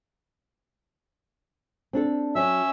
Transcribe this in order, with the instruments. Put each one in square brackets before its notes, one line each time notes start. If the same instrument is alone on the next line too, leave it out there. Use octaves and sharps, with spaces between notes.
[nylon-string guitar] C4 D4 A4
[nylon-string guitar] F#3 [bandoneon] C#4 E5 E6